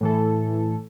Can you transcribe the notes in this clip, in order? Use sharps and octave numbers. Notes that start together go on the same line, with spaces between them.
A2 E3 A4